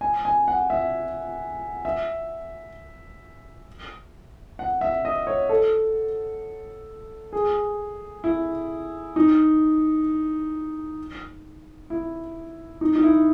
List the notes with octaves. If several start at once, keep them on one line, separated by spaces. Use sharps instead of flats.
G#5
G#5
F#5
E5
E5
F#5
E5
D#5
C#5
A4
G#4
E4
D#4
E4
D#4
D#4
E4